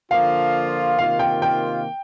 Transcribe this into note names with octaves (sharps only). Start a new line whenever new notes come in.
D3 F3 A#3 F4 F5
C3 D#3 A#3 F4 F5
G5
G5